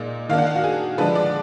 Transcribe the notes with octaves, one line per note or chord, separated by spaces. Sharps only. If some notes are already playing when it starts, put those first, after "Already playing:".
Already playing: A#2 G#3 D#4 D5
D#3 A#3 D4 F5
F#5
F5
F#4
G#4
D3 F3 G#3 D4 B4
D5